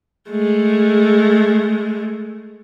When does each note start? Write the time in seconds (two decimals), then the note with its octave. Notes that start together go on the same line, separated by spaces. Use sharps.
0.30 G#3 A3